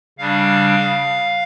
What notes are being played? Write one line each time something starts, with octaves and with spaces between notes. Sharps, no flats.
C#3 G3 D4 F5